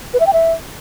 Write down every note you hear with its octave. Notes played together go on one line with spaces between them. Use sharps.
B4
E5
G5
E5